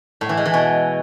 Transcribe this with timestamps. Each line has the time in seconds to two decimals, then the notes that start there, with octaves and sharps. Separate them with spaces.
0.21 A2
0.29 E3
0.37 G#3
0.45 E3
0.54 B2